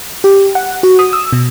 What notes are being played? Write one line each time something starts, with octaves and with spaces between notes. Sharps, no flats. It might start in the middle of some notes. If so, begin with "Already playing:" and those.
G4
F#5
F#4
D#6
E6
B2